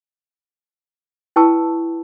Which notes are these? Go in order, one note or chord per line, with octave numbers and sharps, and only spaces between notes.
E4 B4 G5 A5 C#6 E6